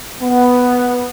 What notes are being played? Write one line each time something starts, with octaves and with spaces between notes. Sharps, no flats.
B3